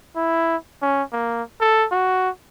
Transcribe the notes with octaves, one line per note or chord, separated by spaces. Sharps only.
E4
C#4
A#3
A4
F#4